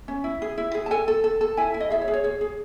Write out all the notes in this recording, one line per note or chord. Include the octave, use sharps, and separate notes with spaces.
C#4
E4
G#4
E4
G#4
A5
A4 G#5
A4
A4
A4
E4 G#5
E4
D#5
G#4 E5
C#5
G#4
C#5
G#4 C#5
G#4